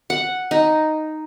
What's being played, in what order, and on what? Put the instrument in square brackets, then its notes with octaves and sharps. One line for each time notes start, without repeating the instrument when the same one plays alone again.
[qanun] F#5
D#4